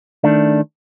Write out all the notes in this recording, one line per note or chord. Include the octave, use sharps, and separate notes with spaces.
D#3 A3 D4